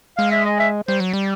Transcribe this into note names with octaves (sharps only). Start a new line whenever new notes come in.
G#3 F5
E5
D#5
E5
G3 C5
F#3
G3